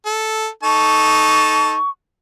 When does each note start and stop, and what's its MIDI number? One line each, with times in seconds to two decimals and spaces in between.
0.06 0.48 69
0.63 1.76 63
0.63 1.76 69
0.63 1.76 81
0.63 1.90 85